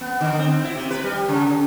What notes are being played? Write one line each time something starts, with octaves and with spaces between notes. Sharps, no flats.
B3
D3
C4
E4
C3
B4
G3
C#3